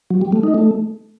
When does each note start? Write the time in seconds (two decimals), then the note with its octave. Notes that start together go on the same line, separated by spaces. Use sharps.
0.10 F#3
0.21 G3
0.32 A3
0.43 D#4
0.54 A3